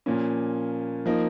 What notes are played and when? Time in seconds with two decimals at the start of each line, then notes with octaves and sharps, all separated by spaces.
0.06 A#2 F3 A#3 C#4
1.06 F3 A#3 D#4